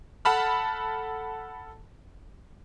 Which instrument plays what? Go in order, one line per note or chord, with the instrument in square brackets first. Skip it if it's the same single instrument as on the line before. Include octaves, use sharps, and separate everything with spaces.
[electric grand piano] A4 F#5 A5 B5 F6